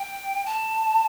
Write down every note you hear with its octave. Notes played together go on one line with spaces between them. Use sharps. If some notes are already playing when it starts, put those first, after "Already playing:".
Already playing: G5
A5